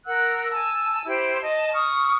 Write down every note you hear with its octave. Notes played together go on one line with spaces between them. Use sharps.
A#4 F#5 E6 F#6
G#5 A5 E6
E4 G4 C5
D#5 A5
C#6 D#6 F6